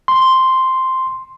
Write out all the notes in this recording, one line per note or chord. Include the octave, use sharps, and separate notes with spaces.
C6